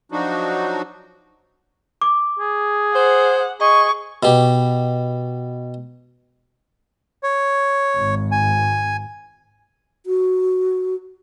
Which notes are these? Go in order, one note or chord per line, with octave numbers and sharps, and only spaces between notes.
F3 F#3 D4 D#4 F#4
D6
G#4
C5 F#5
G#4 D#5 C#6
B2 G4
C#5
G#1
G#5
F#4